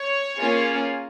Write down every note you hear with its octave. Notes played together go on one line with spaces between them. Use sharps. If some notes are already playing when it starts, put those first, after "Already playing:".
Already playing: C#5
A#3 C#4 F4 G#4